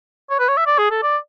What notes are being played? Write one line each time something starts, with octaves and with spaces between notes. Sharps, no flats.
C#5
B4
C#5
E5
D5
G#4
A4
D5